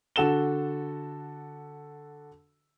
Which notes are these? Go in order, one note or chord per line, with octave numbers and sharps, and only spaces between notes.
D3 F#4 A4 E7 G7